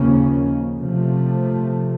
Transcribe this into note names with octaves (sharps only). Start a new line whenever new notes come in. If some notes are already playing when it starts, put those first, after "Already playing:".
Already playing: D#2 C#3 F3 A#3 C#4
C3 F3 A3